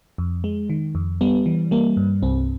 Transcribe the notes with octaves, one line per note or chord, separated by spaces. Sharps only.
F2
G#3
D#3
F2
G3 B3
E3
G3 A#3
G2
C2 C4